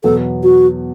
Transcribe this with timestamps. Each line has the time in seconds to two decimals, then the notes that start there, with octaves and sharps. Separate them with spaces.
0.04 E2 B2 F#3 B3 A4
0.43 F#4